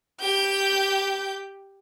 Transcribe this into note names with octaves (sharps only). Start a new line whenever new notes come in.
G4 G6